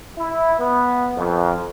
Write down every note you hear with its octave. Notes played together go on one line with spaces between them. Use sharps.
E4
B3
F2